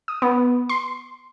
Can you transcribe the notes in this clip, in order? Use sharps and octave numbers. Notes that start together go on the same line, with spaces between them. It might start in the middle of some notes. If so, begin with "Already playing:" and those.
D#6
B3
C6